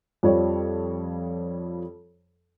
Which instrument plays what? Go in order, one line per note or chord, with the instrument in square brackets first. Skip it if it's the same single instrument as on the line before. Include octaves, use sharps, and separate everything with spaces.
[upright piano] F2 F3 G3 C#5